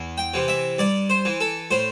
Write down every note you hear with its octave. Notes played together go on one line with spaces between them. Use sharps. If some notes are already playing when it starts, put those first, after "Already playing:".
Already playing: E2
G5
C3 E3
E5
G2 D5
C5
E3
A4
A2 C5